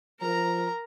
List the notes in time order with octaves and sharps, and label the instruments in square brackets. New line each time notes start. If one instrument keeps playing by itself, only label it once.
[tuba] F3 [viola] A#4 [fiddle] A#5